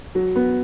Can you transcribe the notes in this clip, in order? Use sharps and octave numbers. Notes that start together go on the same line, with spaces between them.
F#3
B3